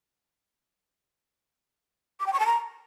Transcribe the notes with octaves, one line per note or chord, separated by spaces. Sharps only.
D6
G5
C#6
A5
A#5